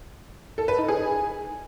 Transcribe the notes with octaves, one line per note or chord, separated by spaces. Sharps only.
A4
B4
D#4
G#4